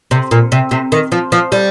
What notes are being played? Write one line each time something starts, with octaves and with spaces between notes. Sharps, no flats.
C3
A#2
C3
C3
D#3
F3
F3
G3